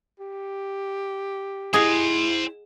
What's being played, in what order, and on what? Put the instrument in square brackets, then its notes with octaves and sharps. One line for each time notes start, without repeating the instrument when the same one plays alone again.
[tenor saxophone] G4
[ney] E4 [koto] G#4 D#5 F#5 [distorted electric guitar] C5 G#5